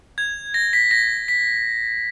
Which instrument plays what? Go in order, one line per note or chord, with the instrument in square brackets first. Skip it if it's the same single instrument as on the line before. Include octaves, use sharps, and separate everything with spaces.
[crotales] G#6
A#6
B6
A#6
B6